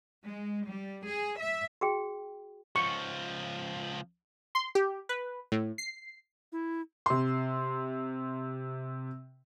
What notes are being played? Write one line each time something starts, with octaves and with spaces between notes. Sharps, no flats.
G#3
G3
G#4
E5
F#4 G#4 G5
C#2 F3 C#6
C6
G4
B4
A2
C7
E4
C3 C6